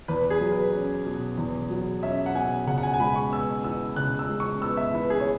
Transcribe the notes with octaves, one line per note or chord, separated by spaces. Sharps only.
E2 B4
G#4
F#3
B4
C#4
B2
E2
F#3
C#4 E5
F#5
B2 G#5
C#3 F#5
F#5
G#5
G#5
G#3 B5
C#6
B3 E6
E3 E6
C#3 F#6
E6
G#3
C#6
B3 E6
E5
E3 B4
G#4
C#5